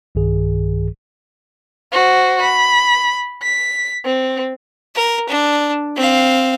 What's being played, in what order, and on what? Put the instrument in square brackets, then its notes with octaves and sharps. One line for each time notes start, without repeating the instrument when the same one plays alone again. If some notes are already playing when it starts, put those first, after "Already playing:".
[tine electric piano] B1 G2 D#3 G#4
[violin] F#4 C5
B5
B6
C4
[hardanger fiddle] A#4
D4
C4 F5